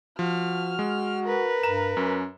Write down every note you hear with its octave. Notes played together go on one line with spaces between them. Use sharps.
F3 F#4 F6
G#3
A#4 B4
G2 A#5 E7
F#2 C#4